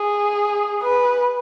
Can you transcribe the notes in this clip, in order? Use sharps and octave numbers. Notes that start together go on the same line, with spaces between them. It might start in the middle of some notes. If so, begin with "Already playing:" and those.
Already playing: G#4
B4